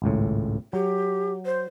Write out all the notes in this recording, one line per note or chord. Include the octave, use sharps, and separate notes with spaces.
G#1 C#2 A2
F#3 G4
C5